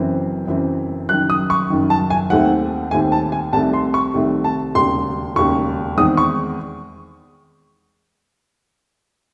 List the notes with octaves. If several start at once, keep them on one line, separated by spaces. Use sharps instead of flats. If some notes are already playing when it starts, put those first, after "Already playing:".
Already playing: F#1 F#2 E3 C4
F#1 F#2 E3 C4
F#1 F#2 D#3 F#6
D#6
C#6
F#1 F#2 D#3
A5
G#5
D#2 D#3 A3 C4 F#5
D#2 D#3 A3 C4 G#5
A5
G#5
C2 C3 D#3 A3 A5
C6
C#6
C2 C3 D#3 A3
A5
E1 D#2 C#3 C6
E1 D#2 C#3 C#6
E2 D#3 G#3 C4 D#6
C#6